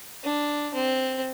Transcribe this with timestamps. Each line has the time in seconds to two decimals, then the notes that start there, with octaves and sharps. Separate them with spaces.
0.24 D4
0.74 C4